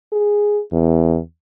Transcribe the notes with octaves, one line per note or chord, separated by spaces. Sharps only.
G#4
E2